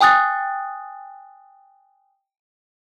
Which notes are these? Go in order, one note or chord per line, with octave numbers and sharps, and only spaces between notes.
G5 G#5 D#6 F#6 A6